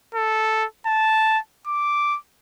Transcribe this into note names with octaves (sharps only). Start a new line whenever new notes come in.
A4
A5
D6